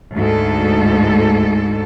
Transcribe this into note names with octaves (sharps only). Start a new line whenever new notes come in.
D2 G#2 A4